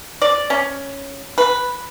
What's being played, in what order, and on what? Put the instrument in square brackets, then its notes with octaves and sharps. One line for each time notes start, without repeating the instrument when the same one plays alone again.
[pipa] D5
C#4
B4